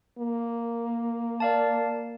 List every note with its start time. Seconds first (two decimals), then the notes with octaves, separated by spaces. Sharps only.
0.18 A#3
1.40 D5 F5 A5